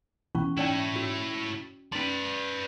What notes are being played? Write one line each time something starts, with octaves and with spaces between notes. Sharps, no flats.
B2 E3 C#4 C#6
C#4 E4 C#5 D5 G5
F#4
C#4 B4 D5 C6